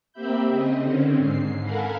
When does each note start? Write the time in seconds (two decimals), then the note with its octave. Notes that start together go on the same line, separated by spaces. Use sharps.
0.13 A#3 C4 G4 E5 B5 G6
0.48 C#3 C4 D#5
0.81 D3 D#3 C4 C#4
1.17 G#2 C7
1.63 A4 A#4 F5 F#5 G#5 B5